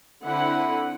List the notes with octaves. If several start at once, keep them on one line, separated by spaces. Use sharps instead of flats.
D3 C4 E4 F#5 B5